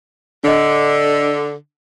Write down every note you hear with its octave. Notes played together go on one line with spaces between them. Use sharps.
D3 D4 D#5